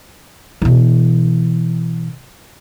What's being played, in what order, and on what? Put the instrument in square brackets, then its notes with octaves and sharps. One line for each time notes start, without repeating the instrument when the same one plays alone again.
[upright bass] B2 E3